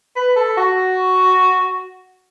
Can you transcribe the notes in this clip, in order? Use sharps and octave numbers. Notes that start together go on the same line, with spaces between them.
B4
A4
F#4